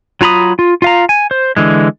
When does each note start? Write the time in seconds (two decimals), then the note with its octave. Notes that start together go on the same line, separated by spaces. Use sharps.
0.21 F#3 F4 A#5 B5 D#6
0.59 F4
0.82 F4 F5 A#5
1.09 G#5
1.31 C5
1.57 D3 E3 G#3